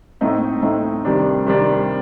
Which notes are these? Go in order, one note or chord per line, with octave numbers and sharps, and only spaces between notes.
A2 A3 C4 D#4
A2 A3 C4 D#4
C3 D#3 G3 D4
C3 D#3 G3 D4